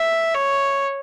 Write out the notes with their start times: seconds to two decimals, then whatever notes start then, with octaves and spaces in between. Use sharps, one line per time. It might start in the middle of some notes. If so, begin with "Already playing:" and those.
Already playing: E5
0.34 C#5